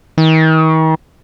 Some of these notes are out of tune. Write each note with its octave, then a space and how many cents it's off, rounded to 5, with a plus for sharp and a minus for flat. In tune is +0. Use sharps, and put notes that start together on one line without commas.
D#3 +40